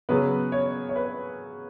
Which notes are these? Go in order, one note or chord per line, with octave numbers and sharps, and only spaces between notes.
C#3 F#3 B3 B4
C#5
C#5
B4